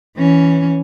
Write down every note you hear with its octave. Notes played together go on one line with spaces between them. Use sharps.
E3 C#4